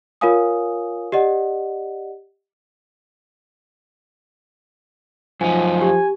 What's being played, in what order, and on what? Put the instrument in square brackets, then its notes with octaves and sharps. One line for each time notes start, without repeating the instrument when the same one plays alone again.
[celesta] F4 A#4 C#5 F5 G#5 D#6
G4 D5 D#5 F#5
[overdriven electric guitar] F#2 D#4 [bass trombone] F3 [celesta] G#5
[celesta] G4 [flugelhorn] G#5